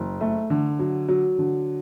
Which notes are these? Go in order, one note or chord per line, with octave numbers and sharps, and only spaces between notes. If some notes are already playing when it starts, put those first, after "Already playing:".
Already playing: F#1
A3
D3
F#3
F#3
D3